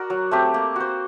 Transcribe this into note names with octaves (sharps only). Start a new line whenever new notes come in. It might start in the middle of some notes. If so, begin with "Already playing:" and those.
Already playing: F#4 A#4 D5
F#3
A3 C4 G4
A#3
F#4 C5